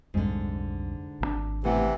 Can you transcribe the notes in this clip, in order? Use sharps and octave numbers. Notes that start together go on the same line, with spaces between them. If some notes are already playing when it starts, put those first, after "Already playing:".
B1 F2 G#2 D3 G3
G#1 C#3 D4
A2 C3 E3 B3 F#5